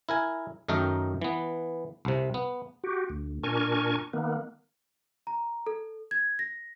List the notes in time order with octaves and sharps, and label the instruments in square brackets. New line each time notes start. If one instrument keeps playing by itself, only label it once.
[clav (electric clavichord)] E4 A#4 G#5
F#2 D#3 A3 D#4 A#4 G5
E3 B3
C2 C3
B3
[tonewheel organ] F#4 G4
D2
A#2 D4 A#4 G#5 C#6
D#3 A#3 B3
[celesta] A#5
A4
G#6
A#6